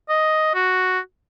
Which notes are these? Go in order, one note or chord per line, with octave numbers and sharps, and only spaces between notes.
D#5
F#4